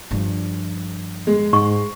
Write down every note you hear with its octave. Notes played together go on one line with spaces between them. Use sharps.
G2 F3
G#3
G#2 C#6